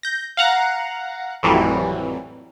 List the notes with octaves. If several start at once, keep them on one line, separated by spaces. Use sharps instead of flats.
G6 A#6
F5 F#5 A#5 F#6
G#1 F2 A2 E3 F#3 G3